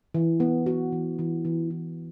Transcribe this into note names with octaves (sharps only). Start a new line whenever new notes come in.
E3
B3
F#4
E3
E3
E3
E3